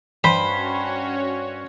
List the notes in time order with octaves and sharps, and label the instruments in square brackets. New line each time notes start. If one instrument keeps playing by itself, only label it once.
[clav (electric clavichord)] G2 [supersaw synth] C#4 F#4 C#5 [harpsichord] C5 [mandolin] B5